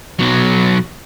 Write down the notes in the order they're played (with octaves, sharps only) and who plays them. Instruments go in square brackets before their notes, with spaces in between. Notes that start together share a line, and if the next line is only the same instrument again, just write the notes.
[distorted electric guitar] B1 F#3